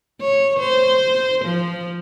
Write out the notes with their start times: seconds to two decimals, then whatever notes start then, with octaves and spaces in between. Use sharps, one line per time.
0.21 C#5
0.59 C5
1.45 F3